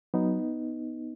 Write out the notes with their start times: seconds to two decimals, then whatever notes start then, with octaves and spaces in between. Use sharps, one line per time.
0.14 F#3 B3 D#4